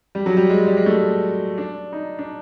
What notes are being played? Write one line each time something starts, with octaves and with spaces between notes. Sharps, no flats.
G3
F#3
G3
G#3
G3
G#3
A3
D4
D#4
D4